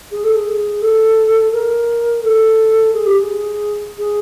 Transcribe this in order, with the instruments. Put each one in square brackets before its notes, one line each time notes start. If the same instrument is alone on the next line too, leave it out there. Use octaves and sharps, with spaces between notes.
[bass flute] G#4
A4
G#4
A4
A#4
A4
G#4
G4
G#4
G#4